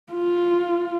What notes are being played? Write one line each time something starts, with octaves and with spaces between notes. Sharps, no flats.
F4